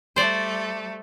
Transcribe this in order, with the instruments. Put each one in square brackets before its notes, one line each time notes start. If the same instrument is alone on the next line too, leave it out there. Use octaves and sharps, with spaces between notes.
[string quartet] G3 A3 [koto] C5 D5